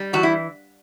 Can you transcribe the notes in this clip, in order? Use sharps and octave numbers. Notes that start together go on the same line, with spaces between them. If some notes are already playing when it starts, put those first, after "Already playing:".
Already playing: G3
E3 F#4
E4